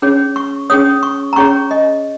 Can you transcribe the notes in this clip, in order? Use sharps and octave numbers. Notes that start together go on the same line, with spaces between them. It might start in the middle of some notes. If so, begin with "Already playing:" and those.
C#4 G#4 C#5
C#6
C#4 G#4 C#5 D#6
C#6
A#5
C#4 G#4 C#5 C#6
D#5